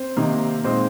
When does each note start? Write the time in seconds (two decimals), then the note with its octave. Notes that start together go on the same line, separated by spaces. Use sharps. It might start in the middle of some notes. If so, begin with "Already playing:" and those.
Already playing: C4 C5
0.17 C3 D#3 A#3 D#4
0.64 A#2 G#3 C4 D#4 C5